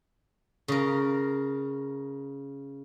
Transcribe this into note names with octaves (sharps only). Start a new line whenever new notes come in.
C#3 A#4